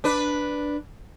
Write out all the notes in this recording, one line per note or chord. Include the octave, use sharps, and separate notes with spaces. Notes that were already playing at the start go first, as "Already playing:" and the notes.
D4 B4